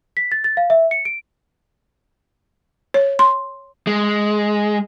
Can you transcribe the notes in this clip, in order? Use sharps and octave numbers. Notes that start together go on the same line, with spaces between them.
B6
A6
A6
F5
E5
C#7
D7
C#5
C6
G#3